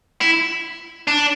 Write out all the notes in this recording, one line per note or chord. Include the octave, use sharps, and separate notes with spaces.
E4
D4